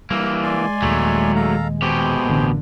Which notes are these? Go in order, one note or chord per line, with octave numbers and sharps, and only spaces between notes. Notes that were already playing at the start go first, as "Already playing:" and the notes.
E3 G3 A#3 E6
G#3 D5 G#5 C6
D#1 D#2 F#3 A3
A4 F5 A#5
B2 G4 G#4 C5
A1 D3 A#3